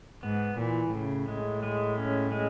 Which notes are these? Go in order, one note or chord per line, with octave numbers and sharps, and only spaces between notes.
G#2 B3
A#2 E3
A2 C#3
G#3
G#3
C#4
G#3